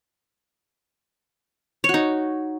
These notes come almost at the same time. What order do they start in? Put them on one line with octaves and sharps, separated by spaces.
C#5 F#4 D#4